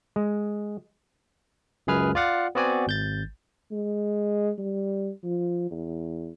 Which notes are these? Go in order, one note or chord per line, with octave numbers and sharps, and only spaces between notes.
G#3
C#2 F#2 G#4 B4 F6
F4 D5 F5 F#5
B3 C4 F#4 D5 G#5
G#1 G6 A6
G#3
G3
F3
E2